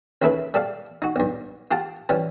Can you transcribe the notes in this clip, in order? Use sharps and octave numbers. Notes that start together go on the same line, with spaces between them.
D#2 C#3 E4 A4 B4 E5
G3 A4 D5 F5
D#4 F#4
B1 G2
F4 G4 F#5 A5
E3 F3 G3 C#4